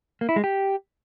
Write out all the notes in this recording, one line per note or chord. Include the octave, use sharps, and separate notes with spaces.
A#3
E4
G#3
G4